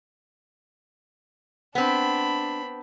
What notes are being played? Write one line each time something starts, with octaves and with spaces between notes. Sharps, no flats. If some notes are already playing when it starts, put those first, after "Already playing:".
B3 C4 D4 B5